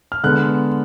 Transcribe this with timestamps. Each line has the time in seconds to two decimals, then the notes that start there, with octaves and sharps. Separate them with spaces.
0.12 F6
0.23 D3 G#3 B3 F#6